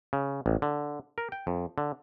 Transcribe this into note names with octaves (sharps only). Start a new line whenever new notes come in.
C#3
A1
D3
A#4
G5
F2
D3